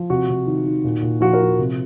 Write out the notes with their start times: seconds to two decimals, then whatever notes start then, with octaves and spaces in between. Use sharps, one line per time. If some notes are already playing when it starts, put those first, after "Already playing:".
Already playing: F3
0.10 C3 F#4
0.29 C3
0.47 D#3
0.66 D#3
0.84 A#2
1.02 A#2
1.21 F3 F#4
1.33 A#4
1.40 F3
1.59 C3